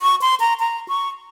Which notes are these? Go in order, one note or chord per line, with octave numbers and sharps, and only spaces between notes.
C#6
C6
A#5
A#5
C#6